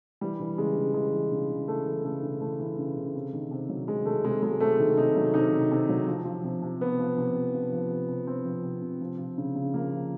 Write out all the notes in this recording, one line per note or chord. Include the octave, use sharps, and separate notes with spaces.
E3 G3
E3
C#3 G#3
C#3
E3 G#3
E3
C#3
C#3
E3 A3
E3
C#3 A3
C#3
E3 A3
E3
C#3
C#3
C3
D#3
C3
F#3
C3 G#3
D#3 A3
C3 G#3
F#3 G#3
C3 A3
D#3
C3 D#4
F#3
C3 D#4
D#3
C3
F#3
F3
F3
C3
C3
F3 B3
F3
C3
C3
F3
F3
C3
C3
F3 C4
F3
C3
C3
F3
F3
C#3
C#3
F3 A#3
F3